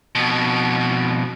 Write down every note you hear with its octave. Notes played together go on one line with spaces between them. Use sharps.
F2 B2